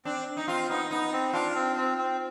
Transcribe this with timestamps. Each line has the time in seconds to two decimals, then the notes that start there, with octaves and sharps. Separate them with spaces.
0.05 C4 D4
0.37 D#4
0.47 C4 F4
0.69 B3 D#4
0.91 B3 D#4
1.12 C4
1.33 D4 F4
1.55 C4
1.76 C4
1.98 C4